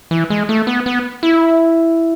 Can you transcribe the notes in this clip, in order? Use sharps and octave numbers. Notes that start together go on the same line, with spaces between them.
E3
G#3
A3
B3
B3
E4